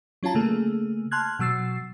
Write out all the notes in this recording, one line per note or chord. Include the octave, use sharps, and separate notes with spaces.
F#3 C#4 F4 A5 A#5
C#3 A3 A#3 G#4
A5 C6 F6 F#6 G#6
B2 F#3 E6 A6 C7